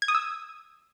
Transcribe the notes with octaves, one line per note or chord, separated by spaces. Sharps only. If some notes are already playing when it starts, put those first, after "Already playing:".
G#6
D#6
E6